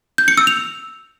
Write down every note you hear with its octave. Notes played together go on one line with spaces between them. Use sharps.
G6
C#7
E6
F7